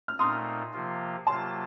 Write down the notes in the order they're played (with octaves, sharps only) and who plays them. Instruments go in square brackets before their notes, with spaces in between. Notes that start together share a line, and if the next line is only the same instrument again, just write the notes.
[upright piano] F6
[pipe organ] A#2 A3 C4 D#4 [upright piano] C6 D#6
[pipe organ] C3 F3 A#3 F4
[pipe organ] C3 F#3 A#3 F4 [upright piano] A5 C6